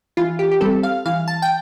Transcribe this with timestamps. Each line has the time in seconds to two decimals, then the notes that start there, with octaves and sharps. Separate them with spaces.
0.17 E3 F4
0.39 G4
0.51 G4
0.61 G3 C4 A4
0.83 F5
1.06 E3 F5
1.28 A5
1.42 G5